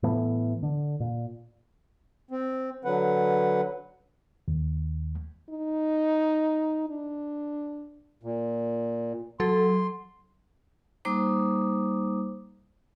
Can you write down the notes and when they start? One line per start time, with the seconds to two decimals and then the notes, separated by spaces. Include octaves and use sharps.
0.03 A2 E3 A3 B3
0.63 D3
1.00 A#2
2.31 C4
2.85 D3 F#3 B4 F#5
4.48 D#2
5.50 D#4
6.90 D4
8.23 A#2
9.40 F#3 A4 C6
11.05 G3 A#3 D#4 C5 D6 D#6